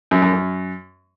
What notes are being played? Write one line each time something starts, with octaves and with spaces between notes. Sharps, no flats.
F#2
F#2
F#2